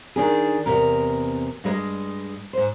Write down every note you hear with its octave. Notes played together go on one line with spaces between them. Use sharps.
D#3 D4 G#4
E2 C3 A#4
G2 G#3 B4 D#5
G#2 C5